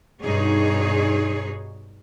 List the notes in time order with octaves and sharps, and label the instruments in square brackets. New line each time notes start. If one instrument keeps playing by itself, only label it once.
[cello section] G2 B2 D#4 G#4 C#5